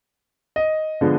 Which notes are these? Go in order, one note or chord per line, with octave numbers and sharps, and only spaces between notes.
D#5
D3 F3 G#3 B3